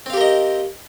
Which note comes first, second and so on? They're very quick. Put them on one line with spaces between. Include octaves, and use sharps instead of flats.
C4 F5 G4 A#4 D#5